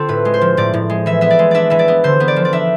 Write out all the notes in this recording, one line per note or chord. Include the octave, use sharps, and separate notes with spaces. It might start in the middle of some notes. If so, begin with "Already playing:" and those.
Already playing: D3 C4 F4 A4
A2 B4
G#3
C5
F3
A2 D5
A2
G#3
E3 E5
B3 E5
D5
G#3
D4 D5 E5
E3 E5
D5
B3
D3 C5
B3
D5
F3
D5
D4 E5